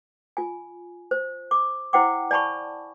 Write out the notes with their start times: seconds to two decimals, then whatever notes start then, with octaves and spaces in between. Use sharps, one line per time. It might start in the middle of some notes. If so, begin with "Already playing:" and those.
0.37 F4 G#5
1.11 C5
1.51 D6
1.93 E4 C5 F#5 G5 D6
2.31 D5 G#5 A5 B5 C#6